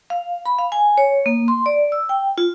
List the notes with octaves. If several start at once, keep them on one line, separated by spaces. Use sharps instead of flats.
F5
B5
F5
G#5
C#5
A#3
C6
D5
E6
G5
F4